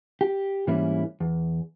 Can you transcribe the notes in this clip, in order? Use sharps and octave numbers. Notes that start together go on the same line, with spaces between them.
G4
G#2 E3 G3 A#3 C#4 E4
E2